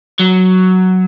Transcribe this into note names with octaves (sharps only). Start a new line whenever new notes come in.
F#3